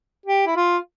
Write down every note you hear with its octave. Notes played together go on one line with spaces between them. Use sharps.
G4
E4
F4